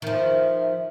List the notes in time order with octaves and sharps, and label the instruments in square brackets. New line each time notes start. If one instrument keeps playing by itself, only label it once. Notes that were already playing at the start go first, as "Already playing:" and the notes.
[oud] D#3 F3 [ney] E5